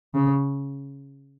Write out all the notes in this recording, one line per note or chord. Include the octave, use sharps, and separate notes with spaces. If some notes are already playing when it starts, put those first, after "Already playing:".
C#3